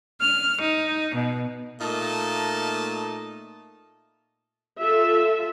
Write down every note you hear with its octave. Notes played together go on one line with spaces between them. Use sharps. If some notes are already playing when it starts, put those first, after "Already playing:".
F6
D#4
B2
A#2 A3 A#3 D#4 D#5 A5
F4 A4 E5